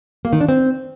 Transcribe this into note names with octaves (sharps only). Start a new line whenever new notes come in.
A#3
D#3
D4
C4